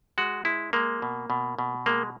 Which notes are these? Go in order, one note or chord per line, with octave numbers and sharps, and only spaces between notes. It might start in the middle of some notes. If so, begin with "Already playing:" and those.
G#3 F#4
G#3 E4
G#3 A#3
B2
B2
B2
G#3 A#3